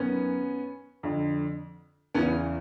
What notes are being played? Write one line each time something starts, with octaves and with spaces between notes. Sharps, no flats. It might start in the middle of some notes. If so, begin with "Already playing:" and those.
Already playing: F#2 D#3 B3 C#4
F2 D3
E2 C#3 E3 B3 C#4